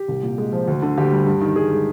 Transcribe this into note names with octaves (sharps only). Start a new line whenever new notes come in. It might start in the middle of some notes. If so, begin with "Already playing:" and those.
Already playing: G4
C2
A#2
G#3
F3
D2
D3
D2 G4
G3
G2
D#3
G2 G#4
G#3